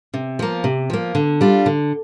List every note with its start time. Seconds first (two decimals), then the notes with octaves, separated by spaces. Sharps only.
0.14 C3
0.39 F3 A#3
0.64 C3
0.90 F3 A#3
1.15 D3
1.41 G3 D4 F4
1.66 D3